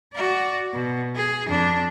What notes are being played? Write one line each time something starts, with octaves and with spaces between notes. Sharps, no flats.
F#4 D5
B2
G#4
F2 D4